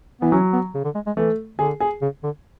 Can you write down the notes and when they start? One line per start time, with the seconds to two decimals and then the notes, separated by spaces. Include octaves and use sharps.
0.21 E3 B3
0.32 F#3 C#4
0.53 B3
0.75 C#3
0.84 D3
0.95 G#3
1.06 G#3
1.17 E3 A3
1.59 D3 G#4
1.80 G#4
2.02 C#3
2.23 D3